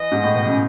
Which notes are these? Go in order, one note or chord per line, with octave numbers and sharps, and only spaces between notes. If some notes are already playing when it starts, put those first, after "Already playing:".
Already playing: E3 D#5
G#2
A2
B2
C#3